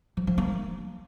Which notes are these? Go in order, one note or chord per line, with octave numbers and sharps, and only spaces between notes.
F3
F3
A#3